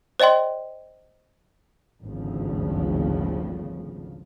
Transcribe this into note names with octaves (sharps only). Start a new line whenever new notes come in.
C5 D5 D#5 G5 C6
G#1 D2 G2 C#3 F3